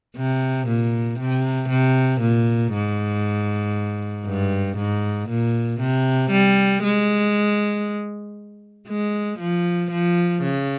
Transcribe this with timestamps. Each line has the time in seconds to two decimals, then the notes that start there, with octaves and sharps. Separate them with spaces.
0.17 C3
0.68 A#2
1.19 C3
1.70 C3
2.21 A#2
2.73 G#2
4.26 G2
4.78 G#2
5.30 A#2
5.81 C3
6.31 G3
6.83 G#3
8.88 G#3
9.40 F3
9.91 F3
10.43 C#3